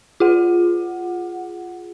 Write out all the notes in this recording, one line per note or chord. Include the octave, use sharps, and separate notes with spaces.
F4 G#4 F#5